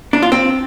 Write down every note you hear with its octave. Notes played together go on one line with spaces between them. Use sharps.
D4
F4
C4